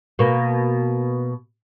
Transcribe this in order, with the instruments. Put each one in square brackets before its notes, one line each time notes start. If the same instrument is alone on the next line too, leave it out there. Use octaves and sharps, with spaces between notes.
[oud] B2 A#3